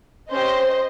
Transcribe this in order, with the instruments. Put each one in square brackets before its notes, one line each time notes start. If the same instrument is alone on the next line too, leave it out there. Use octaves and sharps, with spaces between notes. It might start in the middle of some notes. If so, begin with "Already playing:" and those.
[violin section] C#4 G4 C5 D#5